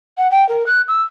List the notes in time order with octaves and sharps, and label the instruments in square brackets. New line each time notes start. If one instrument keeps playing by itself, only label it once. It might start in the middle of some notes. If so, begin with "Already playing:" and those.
[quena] F#5
G5
A#4
F#6
E6